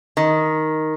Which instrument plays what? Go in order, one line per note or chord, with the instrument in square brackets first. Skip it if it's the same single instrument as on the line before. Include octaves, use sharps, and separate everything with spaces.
[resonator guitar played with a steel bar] D#3